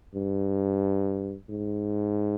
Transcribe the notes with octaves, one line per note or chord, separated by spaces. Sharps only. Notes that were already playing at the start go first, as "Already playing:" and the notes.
G2
G#2